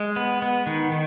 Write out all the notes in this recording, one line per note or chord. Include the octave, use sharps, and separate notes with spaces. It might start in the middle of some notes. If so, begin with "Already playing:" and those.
Already playing: G#3
B3
B3
D#3
D#3